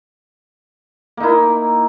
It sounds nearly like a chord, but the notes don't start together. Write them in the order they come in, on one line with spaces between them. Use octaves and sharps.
A#3 D#4 E4